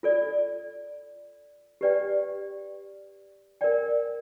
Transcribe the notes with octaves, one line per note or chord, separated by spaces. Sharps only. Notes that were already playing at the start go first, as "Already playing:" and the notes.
F4 A4 D5
G4 B4 D5 G5
A#4 D5 G5